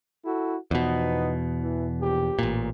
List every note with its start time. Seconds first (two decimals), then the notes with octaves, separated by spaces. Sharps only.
0.25 E4 F#4 A4
0.71 E2 B2 F3 B3 D#4
1.61 E3
2.01 A#1 G4
2.39 A1 A#2